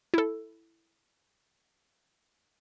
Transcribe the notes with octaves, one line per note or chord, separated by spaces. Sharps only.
E4 A4